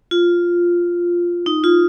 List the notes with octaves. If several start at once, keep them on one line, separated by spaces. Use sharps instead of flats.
F4
D#4
F4